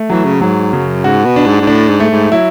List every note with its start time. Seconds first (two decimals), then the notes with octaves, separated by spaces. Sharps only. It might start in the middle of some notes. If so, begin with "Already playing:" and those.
Already playing: A3
0.10 E3 F#3
0.25 C#3
0.41 G#2 F#3
0.73 F#2 C#3
1.04 G#2 F#4
1.26 B2
1.36 D4
1.47 G#2
1.62 G#2
1.67 A2 D4
1.89 G#2
2.00 A3
2.10 G#2
2.31 F#3 E4